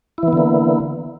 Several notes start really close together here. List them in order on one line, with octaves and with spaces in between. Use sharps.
E4 E3 B3 D3 A#3